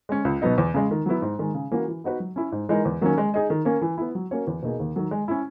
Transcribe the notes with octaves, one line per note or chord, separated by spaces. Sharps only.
G#3 C#4
C#2
B2 F#3 B3 D#4
E2
C#3 G#3
D#3
F#3 B3 E4
G#2
D#3 G#3
C#3
E3 A#3 C#4 F#4
E3
B3 D#4 F#4 B4
F#3
C#4 E4
G#2
E3 G#3 D#4 A#4
E2
D#3 F#3 A#3 C#4
G#3
D#4 G#4 D#5
D#3
A#3 C#4
E3
B3 E4
F#3
A#3 C#4 F#4 C#5
E2
B2 A#3 D#4 G#4
D#2
D#3 F#3
G#3
C#4 E4